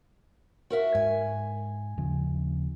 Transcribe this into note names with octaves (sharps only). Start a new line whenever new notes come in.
F#4 A#4 E5
G#2 G#5
D#2 C#3 F3